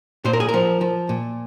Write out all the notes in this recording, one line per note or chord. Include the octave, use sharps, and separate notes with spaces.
A#2 C5
A#4
G#4
A#4
F3
F3
A#2